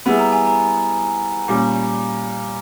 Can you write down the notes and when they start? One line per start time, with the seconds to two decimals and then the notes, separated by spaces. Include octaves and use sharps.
0.06 G3 B3 E4 G#4 B5
0.19 A#5
0.32 G#5
0.46 A#5
1.48 A#2 G3 C#4